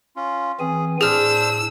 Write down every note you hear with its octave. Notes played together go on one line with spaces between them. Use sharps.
C#4 F4
E3 C4 G#4 G#5
A2 D4 G#4 C5 E6 F6